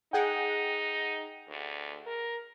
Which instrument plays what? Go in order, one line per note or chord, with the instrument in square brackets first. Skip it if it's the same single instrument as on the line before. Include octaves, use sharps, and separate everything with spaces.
[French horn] D#4 [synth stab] G#4 F#5 G5
[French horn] D2
A#4